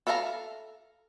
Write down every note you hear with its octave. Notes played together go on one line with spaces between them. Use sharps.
A4 E5 F5 A5 A#5